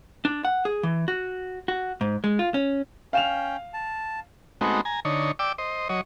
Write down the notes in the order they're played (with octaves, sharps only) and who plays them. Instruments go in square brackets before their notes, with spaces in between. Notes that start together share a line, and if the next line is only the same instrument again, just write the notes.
[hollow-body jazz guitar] D4
F#5
G#4
E3
F#4
F#4
G#2
G#3
F4
C#4
[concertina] C#4 G5 [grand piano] F5 E7 F7
[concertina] A5
[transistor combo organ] G#3 A3 B3 C4 D#4 F#4
G#5 A#5
D3 D#4 C#5
D5 G5 D6 E6
C5 D#5
F#3 C#5 D#5